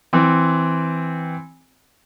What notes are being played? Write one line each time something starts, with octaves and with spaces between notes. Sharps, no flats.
E3 C4